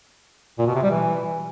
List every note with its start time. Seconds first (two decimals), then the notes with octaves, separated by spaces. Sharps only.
0.59 A#2
0.67 B2
0.75 C3
0.83 G3
0.91 E3